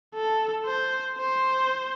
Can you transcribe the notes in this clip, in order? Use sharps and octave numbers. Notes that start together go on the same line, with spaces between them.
A4
C5
C5